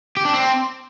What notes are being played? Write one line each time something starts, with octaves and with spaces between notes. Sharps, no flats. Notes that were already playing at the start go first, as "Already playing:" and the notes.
G4
D4
C4